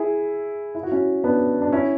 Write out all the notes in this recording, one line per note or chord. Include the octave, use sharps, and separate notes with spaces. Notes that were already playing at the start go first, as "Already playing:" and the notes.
Already playing: E4 G#4
E4
F#4
C#4 E4
B3 D4
D4
C#4 E4